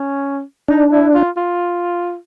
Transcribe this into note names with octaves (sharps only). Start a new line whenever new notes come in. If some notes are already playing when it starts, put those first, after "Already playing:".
Already playing: C#4
D4 D#4
E4
F4
F4